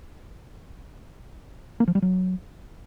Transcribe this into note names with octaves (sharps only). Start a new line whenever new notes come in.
A#3
F3
G3
F#3